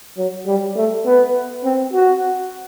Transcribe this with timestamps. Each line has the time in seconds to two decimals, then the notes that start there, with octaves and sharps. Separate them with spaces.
0.18 F#3
0.47 G3
0.76 A3
1.05 B3
1.64 C4
1.93 F#4